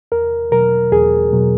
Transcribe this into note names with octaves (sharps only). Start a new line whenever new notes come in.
E2 A#4
B2 F#3 A#4
E2 G#4
B2 F#3